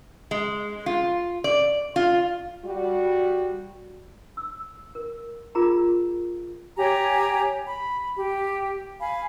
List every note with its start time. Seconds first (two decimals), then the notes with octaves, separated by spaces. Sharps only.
0.31 G#3
0.86 F4
1.44 D5
1.96 F4
2.65 G3 F#4
4.37 E6
4.95 A#4
5.55 F4 G#4 A#4 A#5
6.77 G4 C#5 G#5 A#5
7.65 B5
8.18 G4
9.00 F5 G#5 B5